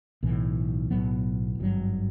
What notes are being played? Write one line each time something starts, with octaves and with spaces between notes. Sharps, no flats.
B1 A2 E3
B1 A2 F#3 B3
G#1 G2 D#3 F#3